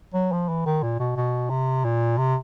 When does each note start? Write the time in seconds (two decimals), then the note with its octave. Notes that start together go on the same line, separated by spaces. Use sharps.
0.14 F#3
0.32 F3
0.49 E3
0.66 D#3
0.83 A#2
0.99 B2
1.16 B2
1.50 C3
1.85 A#2
2.18 C3